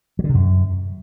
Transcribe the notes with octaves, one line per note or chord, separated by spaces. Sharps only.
F#3
D3
C3
F#2